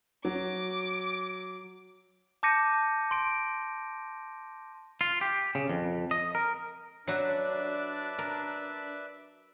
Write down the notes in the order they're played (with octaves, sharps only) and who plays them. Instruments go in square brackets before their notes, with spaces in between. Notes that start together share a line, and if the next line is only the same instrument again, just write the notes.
[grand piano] F#3 [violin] D6
[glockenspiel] A5 D6 G6 A#6 C#7 D#7
C6 D7
[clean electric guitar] F4
G4
C#3
F2
D#5
A#4
[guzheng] F#3 F#4 [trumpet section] D4 [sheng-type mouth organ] B4 D5 E5
[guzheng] A#4